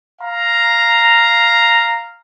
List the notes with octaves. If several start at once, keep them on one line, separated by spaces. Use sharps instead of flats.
F5 A#5